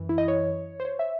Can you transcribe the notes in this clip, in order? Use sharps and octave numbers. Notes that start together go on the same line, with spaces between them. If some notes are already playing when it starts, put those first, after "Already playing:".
Already playing: F#2 E3
E4
D#5
C#5
C5
C#5
E5